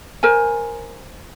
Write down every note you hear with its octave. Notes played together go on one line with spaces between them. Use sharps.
A#4 C5 G#5